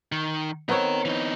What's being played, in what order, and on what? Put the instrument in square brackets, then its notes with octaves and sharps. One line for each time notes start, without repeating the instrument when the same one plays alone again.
[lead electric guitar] D#3
[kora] B3 C4 C#5 [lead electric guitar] D#4 A#4
[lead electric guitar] E3 D#4